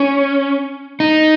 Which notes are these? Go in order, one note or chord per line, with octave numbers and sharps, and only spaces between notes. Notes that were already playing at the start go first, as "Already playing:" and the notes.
Already playing: C#4
D#4